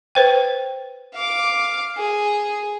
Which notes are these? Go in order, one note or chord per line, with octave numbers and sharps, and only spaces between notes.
B4 C5 G5
F5 D6
G#4